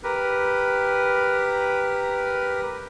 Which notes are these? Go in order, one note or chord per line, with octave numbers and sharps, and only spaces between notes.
G4 A#4 B4